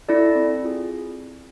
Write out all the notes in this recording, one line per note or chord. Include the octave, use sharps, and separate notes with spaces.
E4 A4 D5
C4
F4 G#4